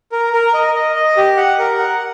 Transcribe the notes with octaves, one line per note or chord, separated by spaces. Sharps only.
A#4
A#4
D#5
D#5
D#5
G4
F#5
A#4
F#5